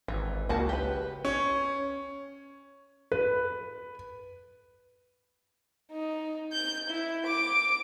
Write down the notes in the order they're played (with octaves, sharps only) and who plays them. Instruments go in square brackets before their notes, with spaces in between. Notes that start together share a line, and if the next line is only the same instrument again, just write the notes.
[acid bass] G#1 [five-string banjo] E3
[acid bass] C#2 [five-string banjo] A#3 F#4 A5
[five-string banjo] G4 B4
[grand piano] C#4
[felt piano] B4
[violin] D#4
G6
E4
D6